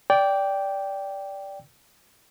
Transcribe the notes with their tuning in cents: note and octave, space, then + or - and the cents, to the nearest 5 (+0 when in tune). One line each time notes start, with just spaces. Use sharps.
D5 -15 G5 +0